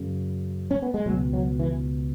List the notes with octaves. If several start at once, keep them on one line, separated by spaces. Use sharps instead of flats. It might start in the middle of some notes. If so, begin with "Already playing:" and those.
Already playing: F#2 C#3
C#4
B3
G#3
C#2 B2 F#3
F#3
E3